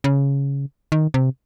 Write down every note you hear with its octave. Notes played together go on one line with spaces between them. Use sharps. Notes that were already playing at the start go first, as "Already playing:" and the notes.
C#3
D#3
C3